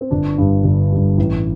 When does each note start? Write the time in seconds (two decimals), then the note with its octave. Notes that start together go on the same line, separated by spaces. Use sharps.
0.01 C4
0.11 G1 D4
0.38 G2 G3
0.64 G1
0.92 G2 G3
1.18 A1